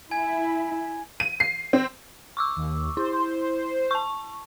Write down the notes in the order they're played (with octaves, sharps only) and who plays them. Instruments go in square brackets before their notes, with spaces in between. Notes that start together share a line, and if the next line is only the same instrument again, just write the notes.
[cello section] E4 [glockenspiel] G#5 G#6
[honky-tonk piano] D#7
C7
C4
[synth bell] C#6 D6 E6
[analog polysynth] D#2
[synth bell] E4 [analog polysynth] C5
[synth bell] A5 C#6